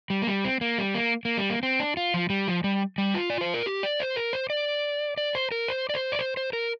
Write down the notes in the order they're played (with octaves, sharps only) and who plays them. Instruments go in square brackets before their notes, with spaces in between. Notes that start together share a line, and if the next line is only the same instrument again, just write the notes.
[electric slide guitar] G3
A#3
G3
C4
A#3
G3
A#3
A#3
G3
A#3
C4
D4
F4
F3
G3
F3
G3
G3
F4
D5
C5
A#4
G4
D5
C5
A#4
C5
D5
D5
C5
A#4
C5
D5
C5
D5
C5
C5
A#4